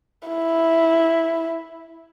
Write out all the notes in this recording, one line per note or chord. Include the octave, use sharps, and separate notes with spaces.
E4